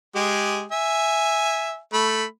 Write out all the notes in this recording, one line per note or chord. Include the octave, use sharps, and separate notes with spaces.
G#3 G4 G#4
E5 G#5
A3 B5